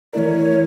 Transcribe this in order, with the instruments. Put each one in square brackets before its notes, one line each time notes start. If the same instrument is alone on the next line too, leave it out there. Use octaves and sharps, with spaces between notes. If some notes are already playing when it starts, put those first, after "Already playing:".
[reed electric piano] E3 A3 E4 A#4 [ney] C#5 D5